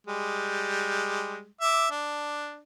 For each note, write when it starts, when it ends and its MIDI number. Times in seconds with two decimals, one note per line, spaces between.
0.07 1.47 55
0.07 1.47 56
1.61 1.87 76
1.61 1.87 86
1.91 2.60 62